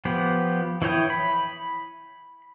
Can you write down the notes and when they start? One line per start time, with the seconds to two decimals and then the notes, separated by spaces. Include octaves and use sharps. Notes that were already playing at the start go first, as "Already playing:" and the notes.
0.05 F3 B3 G4
0.82 E3 E4 C#5 G5 D#6
1.10 B5